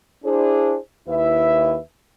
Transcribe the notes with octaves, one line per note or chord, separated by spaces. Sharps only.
D4 E4 G#4 C5
D#2 E4 B4 E5